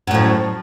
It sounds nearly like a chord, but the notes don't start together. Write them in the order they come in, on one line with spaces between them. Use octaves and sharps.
F#2 A2 F3